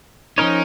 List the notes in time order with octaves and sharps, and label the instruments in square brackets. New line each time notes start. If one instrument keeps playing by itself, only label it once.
[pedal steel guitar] F3 C#4 A#4 C#5 [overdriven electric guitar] D#4